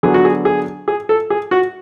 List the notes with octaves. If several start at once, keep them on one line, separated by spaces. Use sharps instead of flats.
D3 F#3 B3 G#4
F#4
G#4
G#4
G#4
A4
G#4
F#4